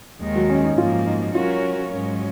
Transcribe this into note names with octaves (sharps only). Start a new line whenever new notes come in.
D#2 D#3 G#3
F#3
C#4
D#4
G#2 F3 A#3 F4
D#4
F#3 C#4 F4 F#4 A#4 C#5
G#2 F#3 C#4